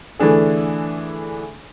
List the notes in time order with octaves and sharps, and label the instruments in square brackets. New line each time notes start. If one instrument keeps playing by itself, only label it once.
[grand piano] D3 E3 A3 D4 G#4